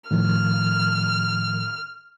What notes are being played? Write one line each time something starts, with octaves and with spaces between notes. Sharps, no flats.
A2 D#3 F3 F6